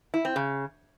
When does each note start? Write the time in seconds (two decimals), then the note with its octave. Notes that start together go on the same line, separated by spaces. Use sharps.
0.14 E4
0.25 C4
0.36 C#3